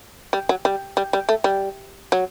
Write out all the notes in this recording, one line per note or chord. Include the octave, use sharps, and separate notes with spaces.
G3
F#3
G3
G3
G3
A3
G3
F#3